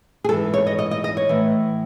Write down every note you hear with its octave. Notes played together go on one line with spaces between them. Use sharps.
G#4
G#2 E3 A4
C#5
D#5
D#5
D#5
D#5
C#5
A2 E3